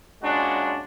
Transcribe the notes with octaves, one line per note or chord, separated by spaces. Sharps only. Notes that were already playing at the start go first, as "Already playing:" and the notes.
A#2 G#3 C#4 D4 F#4